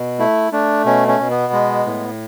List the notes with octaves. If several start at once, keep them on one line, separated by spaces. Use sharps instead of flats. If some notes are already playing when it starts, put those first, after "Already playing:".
Already playing: B2
A3 E4
A3 D4
B2 C#4
C#4
B2
B3
G#3
A2